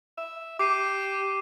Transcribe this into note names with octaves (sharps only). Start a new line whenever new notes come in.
E5
G4 D6 C7 D#7